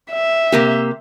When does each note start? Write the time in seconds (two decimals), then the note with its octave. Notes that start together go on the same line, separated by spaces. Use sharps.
0.11 E5
0.52 C3 A#3 G4